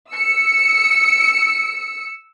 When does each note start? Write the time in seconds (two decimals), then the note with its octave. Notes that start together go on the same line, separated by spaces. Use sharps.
0.11 E6 C#7